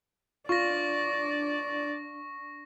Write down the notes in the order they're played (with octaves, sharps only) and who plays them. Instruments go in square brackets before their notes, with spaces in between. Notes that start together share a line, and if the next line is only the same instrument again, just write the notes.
[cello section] D4 [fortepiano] F4 [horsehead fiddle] D5 [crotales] C#6 A#6